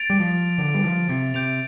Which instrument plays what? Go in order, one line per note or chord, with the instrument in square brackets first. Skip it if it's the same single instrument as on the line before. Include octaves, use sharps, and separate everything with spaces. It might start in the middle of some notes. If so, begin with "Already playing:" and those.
Already playing: [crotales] A6 D7 F7
[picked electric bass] G3
F3
D3
G3
F3
C3
[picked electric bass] C3 [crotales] G6 D7 F7